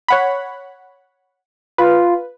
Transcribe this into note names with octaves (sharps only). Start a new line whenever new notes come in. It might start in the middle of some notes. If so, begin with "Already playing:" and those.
C#5 F#5 B5
F4 B4